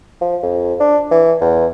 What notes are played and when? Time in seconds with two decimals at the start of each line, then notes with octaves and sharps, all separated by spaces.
0.21 F3
0.43 F2
0.80 D4
1.11 E3
1.41 E2